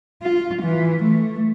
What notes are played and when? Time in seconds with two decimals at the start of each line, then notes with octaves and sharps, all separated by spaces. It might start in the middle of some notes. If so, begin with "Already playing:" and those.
0.23 F4
0.62 E3
1.03 A3